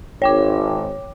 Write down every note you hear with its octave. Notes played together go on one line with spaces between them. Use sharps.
G#1 C#5 G5 D6